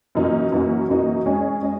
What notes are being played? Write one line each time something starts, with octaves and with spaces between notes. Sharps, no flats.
F#2 E3 A#3 D#4 F#4
F#2 E3 A#3 D#4 F#4
F#2 E3 A#3 D#4 F#4
G#3 C#4 G#4 D#5
G#3 C#4 G#4 D#5